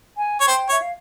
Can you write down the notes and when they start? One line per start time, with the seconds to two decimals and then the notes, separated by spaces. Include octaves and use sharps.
0.17 G#5
0.41 C#5
0.47 C5 G5
0.69 C#5 E5
0.82 F5